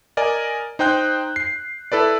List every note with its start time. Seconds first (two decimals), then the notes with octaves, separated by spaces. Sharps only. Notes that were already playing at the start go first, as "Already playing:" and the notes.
0.17 A#4 D5 D#5 G#5
0.79 D#4 C5 G5 F#6 G6
1.36 C7
1.92 E4 A4 B4 D5